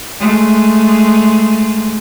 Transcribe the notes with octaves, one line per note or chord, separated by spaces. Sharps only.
G#3 A3